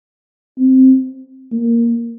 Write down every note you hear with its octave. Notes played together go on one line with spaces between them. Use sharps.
C4
A#3